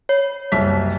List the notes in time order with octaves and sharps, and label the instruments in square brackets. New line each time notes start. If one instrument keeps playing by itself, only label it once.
[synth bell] C#5
[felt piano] F#1 C2 B6